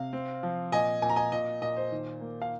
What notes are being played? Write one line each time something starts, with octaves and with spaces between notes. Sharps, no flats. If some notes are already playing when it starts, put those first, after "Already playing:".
Already playing: C3 F5
C4
F3
A#2 D#5 G#5
A#2 G#5
A#5
D#5 G#5
A#2 D#5
A#2 D#5
C5
D#3
A#3
F5